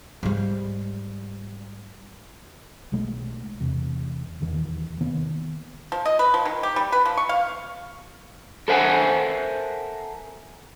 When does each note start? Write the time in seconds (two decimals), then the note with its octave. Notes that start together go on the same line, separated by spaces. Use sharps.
0.23 G#2 G3
2.92 B1 B2 G#3 A3
3.60 E2 C3
4.40 D#1 E2 D#3 E3
5.01 C3 D#3 A#3 B3
5.92 F3
6.06 D#5
6.19 B4
6.34 F3
6.46 D#3
6.63 G4
6.76 G3
6.92 B4
7.06 F3
7.17 C#6
7.29 F5
8.68 A4 A#4 C5 E5 F#5 G#5